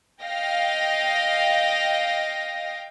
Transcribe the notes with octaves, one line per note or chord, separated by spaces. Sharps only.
D#5 F5 G5 A#6